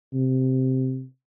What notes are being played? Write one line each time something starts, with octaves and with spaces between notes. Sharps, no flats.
C3